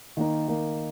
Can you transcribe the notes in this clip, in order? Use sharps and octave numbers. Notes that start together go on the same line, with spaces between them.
D#3 A#3 D#4
D#3 A#3 D#4